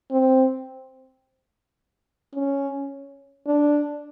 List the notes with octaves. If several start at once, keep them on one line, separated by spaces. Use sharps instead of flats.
C4
C#4
D4